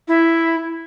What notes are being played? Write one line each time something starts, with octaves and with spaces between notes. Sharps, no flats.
E4